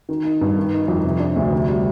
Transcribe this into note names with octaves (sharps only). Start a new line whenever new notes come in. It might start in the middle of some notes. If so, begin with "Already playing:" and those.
D#3
D#4
G2
D#3
D#4
F2
C3
D4
D2
C3
G3